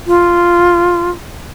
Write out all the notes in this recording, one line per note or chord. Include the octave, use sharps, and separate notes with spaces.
F4